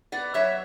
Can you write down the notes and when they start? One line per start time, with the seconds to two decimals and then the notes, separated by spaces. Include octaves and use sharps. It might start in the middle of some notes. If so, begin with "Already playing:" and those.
0.12 B3 D5 F#5
0.34 F#3 C#5 E5